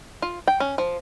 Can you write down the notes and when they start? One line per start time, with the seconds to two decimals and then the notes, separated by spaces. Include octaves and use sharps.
0.22 F4
0.48 G5
0.60 C#4
0.78 F3